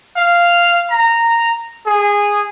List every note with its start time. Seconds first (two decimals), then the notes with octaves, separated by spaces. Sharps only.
0.17 F5
0.90 A#5
1.87 G#4